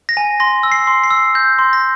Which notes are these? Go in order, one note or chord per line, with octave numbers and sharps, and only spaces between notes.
A#6
G#5
C6 A#6
E6
C7
C6
C7
E6
G6 A#6
C6
A#6